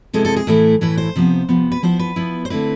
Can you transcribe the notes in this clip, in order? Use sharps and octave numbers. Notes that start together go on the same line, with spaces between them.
C3 G#3 B3 E4 A4
A4
G#4
A2 E3 A3 E4
A2 E3 A3 E4 B4
C5
C3 F3 B3
C3 F3 B3
B4
F3 B3 E4 C5
B4
F3 B3 E4
C5
D3 A3 C4 E4 B4